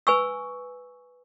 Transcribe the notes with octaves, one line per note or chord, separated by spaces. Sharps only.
B4 G#5 C#6 E6